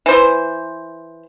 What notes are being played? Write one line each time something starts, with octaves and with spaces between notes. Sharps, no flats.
E3 C5